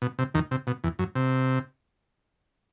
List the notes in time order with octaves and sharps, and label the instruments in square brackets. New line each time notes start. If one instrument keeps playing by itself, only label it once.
[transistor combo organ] B2
C3
D#2 D#3
C3
B2
E2
F#2
C3